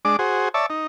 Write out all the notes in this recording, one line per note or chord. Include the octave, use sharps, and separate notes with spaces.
G#3 D4 D6
F#4 G#4 C5
C#5 D5 E5 A5
D#4